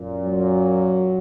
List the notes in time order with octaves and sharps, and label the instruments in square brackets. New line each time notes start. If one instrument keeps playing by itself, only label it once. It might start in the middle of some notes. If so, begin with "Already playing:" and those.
Already playing: [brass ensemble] F#2 A#2
[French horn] F#3